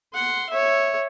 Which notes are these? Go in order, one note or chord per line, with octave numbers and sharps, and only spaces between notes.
F#5 C6
C#5 E5